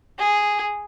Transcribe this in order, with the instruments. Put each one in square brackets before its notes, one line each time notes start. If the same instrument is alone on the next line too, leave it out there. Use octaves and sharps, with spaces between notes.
[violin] G#4